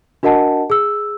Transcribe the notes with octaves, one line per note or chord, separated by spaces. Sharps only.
D4 F#4 A#4 D#5 F#5 A5
G#4 E6